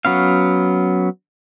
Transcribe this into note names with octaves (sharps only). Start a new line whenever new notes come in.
F#3 B3 C#4 F5